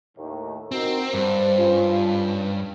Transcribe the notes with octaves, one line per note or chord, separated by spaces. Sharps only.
D#2 A2
C4 D#4 F#4 A#4
G2 C5
C#4 F4